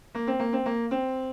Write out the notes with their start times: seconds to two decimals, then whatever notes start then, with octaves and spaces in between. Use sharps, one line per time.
0.15 A#3
0.27 C4
0.40 A#3
0.53 C4
0.66 A#3
0.91 C4